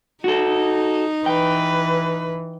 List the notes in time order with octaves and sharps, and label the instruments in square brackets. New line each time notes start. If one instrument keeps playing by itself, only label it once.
[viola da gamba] D#4 [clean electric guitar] F#4 A4
[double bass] E3 [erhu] B4 [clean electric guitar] G5